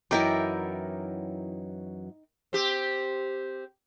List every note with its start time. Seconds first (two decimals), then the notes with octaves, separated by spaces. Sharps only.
0.11 F#2 E3 F#3 D#4 E4 A#4 D5 G5
2.53 C4 G4